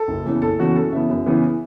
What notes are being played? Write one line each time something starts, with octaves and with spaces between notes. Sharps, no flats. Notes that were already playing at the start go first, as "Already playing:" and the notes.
Already playing: A4
F#1
E2 C#3 E3
F#1 A4
E2 C#3 E3 F#4
F#2 A4
C#3 E3 B3 E5
F#2
C#3 E3 B3